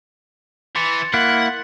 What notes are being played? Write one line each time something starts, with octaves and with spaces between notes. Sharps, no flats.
E3 C6 A6 C#7
A#3 E4 F#5 F#6 F#7